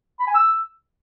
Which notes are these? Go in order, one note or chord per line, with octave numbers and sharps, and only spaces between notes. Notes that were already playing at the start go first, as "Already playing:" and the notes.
B5
G#5
E6